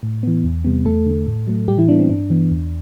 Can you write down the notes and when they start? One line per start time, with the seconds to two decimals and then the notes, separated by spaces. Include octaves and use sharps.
0.03 A2
0.23 E3 B3
0.44 E2
0.64 C3 G3 B3
0.85 E2 A3 A4
1.06 D3 A3
1.27 A2
1.47 F#3 A3
1.68 A2 G3 G4
1.78 E3 E4
1.89 E3 G3 B3 D4
1.99 C4
2.09 G2 D4
2.30 E3 B3
2.51 E2